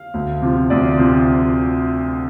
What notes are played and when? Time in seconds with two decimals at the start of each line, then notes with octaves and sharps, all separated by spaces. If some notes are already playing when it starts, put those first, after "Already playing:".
Already playing: F5
0.14 D2
0.42 C3 F3
0.70 D2 D5
0.98 C3 F3